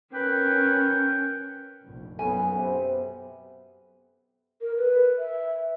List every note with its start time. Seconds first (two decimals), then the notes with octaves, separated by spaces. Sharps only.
0.14 C#4 A#4 B4 G5
1.84 F1 A#1
2.19 B1 F#2 F#3 B3 G#5
2.57 C3 B3
4.61 A#4
4.77 B4
5.19 E5